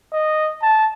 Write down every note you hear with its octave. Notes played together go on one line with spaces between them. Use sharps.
D#5
A5